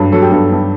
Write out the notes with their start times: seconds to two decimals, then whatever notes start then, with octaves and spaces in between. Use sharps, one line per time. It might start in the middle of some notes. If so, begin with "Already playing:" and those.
Already playing: G2 F#3 A4
0.12 F#3 A4
0.22 G4
0.32 G2 A4
0.52 G2